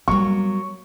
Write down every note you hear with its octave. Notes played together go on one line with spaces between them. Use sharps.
F#3 G3 A#3 B3 C#6